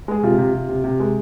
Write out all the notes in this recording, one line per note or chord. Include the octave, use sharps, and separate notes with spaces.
G#3 G#4
C3 F4
C3
C3
C3
C3
G#3